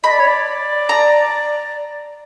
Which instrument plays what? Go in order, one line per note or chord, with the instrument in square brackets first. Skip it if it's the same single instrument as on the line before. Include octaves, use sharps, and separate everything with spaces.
[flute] D#5 [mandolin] B5
[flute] D5
C#5
D5
[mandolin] A#5